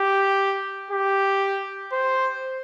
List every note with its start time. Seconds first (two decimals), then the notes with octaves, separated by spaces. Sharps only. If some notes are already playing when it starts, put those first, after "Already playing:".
Already playing: G4
0.91 G4
1.93 C5